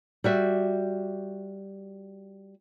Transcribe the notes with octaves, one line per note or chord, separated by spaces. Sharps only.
G3 F#4 E5